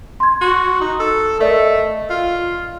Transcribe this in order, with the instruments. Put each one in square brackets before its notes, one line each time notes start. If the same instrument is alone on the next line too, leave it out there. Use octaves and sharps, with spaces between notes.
[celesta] C6 G#6
[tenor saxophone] F#4
D#4
A4
[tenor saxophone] A3 [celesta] A#4 D5 D#5
[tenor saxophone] F4